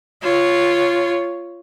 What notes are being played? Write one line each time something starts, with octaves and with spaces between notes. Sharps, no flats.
F4 C#5